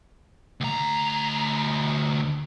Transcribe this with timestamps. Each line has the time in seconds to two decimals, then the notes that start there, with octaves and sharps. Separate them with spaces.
0.61 D2 A#5